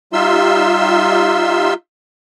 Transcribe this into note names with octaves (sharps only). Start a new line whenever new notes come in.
G3 D#4 F4 E5 C6 E6